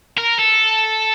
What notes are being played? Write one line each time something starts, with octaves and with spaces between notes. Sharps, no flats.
A#4
A4